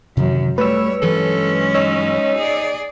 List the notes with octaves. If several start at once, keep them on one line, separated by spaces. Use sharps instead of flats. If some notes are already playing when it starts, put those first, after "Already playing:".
F#2 C3 D#3 E3 F#3
G3 A3 B4 C#5 E6
G2 E3 F#3 G#3 C#4 A4
D#4 C#5 E6
G#4 D5